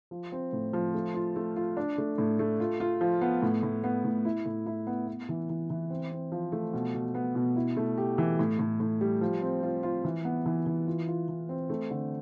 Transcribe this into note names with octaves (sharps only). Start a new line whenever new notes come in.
F3
C4
A2
F3
A3
F4
A3
F4
D4
A3
A2
A3
F4
F4
F3
B3
A2
A2
B3
A2
E4
A2
E4
B3
B3
E3
E3
E3
C4
C4
F3
A3
B2
B2
B3
B2
E4
A3
G4
E3
A2
A2
A2
G3
F3
C4
F4
F4
E3
B3
E3
E3
F4
F4
E3
C4
A3
D3